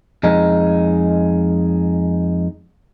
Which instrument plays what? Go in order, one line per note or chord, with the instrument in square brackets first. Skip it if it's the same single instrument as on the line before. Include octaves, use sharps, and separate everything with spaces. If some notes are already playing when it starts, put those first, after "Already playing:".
[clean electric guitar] F2 G#3 D#4